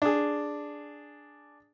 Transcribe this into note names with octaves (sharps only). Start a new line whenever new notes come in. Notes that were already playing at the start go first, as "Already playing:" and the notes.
D4 G#4